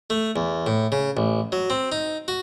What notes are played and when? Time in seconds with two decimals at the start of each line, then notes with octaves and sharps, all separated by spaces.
0.10 A3
0.36 E2
0.67 A2
0.92 C#3
1.17 A1
1.52 F#3
1.70 C4
1.92 D#4
2.28 F#4